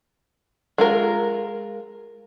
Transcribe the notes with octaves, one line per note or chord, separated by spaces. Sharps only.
G#3 F4 A#4